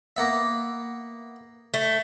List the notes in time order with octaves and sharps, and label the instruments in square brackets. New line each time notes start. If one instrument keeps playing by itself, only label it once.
[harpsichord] A#3 B3 E5
[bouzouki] A3